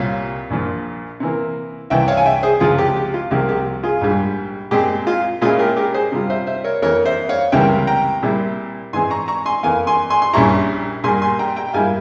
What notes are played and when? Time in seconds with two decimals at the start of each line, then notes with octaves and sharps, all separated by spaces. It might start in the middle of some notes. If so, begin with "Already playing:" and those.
Already playing: C2 A#2 G3 C4 F4 C#5 F5
0.50 A#1 A#2 F3
1.20 C3 E3 A#3
1.90 C2 C3 E3 E5 G5
2.08 C#5 F5
2.17 G#5
2.26 E5 G5
2.43 G#4 C5
2.60 C#2 C3 F3 F4 G#4
2.78 G4
2.96 G4
3.14 F4
3.31 C2 C3 F3 A#3 G4
3.49 G4
3.83 F4 G#4
4.01 A#1 G#2 G3
4.71 A#2 G#3 C4 G4
5.07 F4
5.41 A#2 G#3 C#4 E4 F4 G#4
5.59 G4 A#4
5.77 G4 A#4
5.94 G#4 C5
6.12 C3 G3 C4 F4
6.30 C5 E5
6.47 C5 E5
6.64 A#4 C#5
6.82 F2 E3 A#3 A#4 C#5
7.06 C5 E5
7.29 C#5 F5
7.52 C#2 C3 E3 G3 A#3 E5 G5
7.87 G5 A#5
8.22 A#2 G3 C4 E4
8.93 G#2 E3 G#3 C4 G#5 C6
9.10 A#5 C#6
9.28 A#5 C#6
9.46 G#5 C6
9.63 F2 E3 A#3 F5 G#5
9.87 G#5 C6
10.10 G#5 C6
10.22 C6
10.34 A#1 A#2 G3 C#4 E4 A#5 C#6
11.04 A#2 G3 A#3 G#5 C6
11.22 G#5 C6
11.39 G5 A#5
11.56 G5 A#5
11.69 G5
11.74 G#2 G3 A#3 E4 F5 G#5